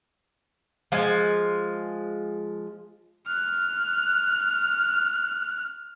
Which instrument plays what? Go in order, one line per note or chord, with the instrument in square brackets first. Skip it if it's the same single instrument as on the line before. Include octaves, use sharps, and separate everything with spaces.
[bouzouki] F3 G#3 G#5
[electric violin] F6 F#6